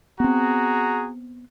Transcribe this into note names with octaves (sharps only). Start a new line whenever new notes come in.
B3 C4 F#4 G#4 A#5